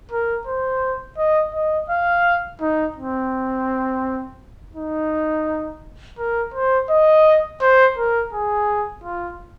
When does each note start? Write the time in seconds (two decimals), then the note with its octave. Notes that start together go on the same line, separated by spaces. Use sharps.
0.11 A#4
0.47 C5
1.17 D#5
1.54 D#5
1.90 F5
2.61 D#4
2.97 C4
4.75 D#4
6.18 A#4
6.54 C5
6.90 D#5
7.61 C5
7.97 A#4
8.33 G#4
9.04 F4